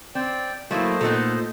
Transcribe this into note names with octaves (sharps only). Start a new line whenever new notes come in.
C4 D5 G5
F#3 A3 A#3 E4 C5 D#5
A#2 A3 B3 D#4 A4